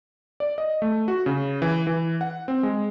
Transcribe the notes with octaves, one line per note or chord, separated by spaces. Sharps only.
D5
D#5
A3
F#4
C#3
E3
E3
F#5
C4
G#3